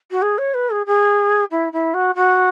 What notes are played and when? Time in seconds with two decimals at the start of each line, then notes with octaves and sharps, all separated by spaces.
0.11 F#4
0.22 G#4
0.38 C#5
0.54 B4
0.70 G#4
0.86 G#4
1.51 E4
1.72 E4
1.94 F#4
2.15 F#4